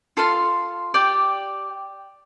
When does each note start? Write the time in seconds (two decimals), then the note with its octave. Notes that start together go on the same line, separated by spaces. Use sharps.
0.17 F4 A4 F5 C6
0.94 G4 D5 G5 D6